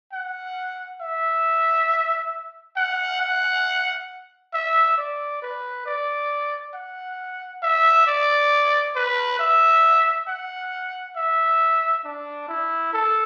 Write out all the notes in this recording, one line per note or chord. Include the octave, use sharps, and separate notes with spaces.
F#5
E5
F#5
F#5
E5
D5
B4
D5
F#5
E5
D5
B4
E5
F#5
E5
D4
E4
A4